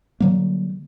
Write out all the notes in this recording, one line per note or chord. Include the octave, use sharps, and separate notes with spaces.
D3 F#3 G3 A#3